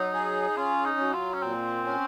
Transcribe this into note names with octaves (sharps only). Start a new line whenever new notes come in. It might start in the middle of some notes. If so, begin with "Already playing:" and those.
Already playing: F#3 D#4
G#4
C#4 F4
D#4
F#3
F4
C#4
A#2 C4
C#4